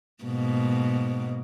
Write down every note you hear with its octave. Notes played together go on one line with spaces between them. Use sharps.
G#2 B2 A#3